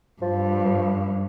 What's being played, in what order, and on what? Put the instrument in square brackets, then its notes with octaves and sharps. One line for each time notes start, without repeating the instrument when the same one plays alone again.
[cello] G2 [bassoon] F3